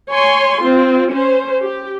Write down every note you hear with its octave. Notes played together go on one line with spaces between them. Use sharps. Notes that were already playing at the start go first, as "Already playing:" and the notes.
C#5 G#5 C6
C4 F4
C#4 C5
G4